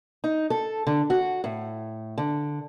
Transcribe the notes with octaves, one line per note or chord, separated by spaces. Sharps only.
D#4
A4
D3
F#4
A2
D3